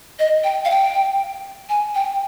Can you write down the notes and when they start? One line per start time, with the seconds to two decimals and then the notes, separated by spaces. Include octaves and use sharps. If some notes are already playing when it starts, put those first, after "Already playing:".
0.20 D#5
0.44 G5
0.65 F5
0.70 G5
1.69 G#5
1.95 G5